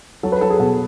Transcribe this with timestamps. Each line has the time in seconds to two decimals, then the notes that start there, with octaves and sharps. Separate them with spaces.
0.23 F#3 A4
0.32 B4
0.41 F#3 A4
0.50 G#4
0.59 B2 A4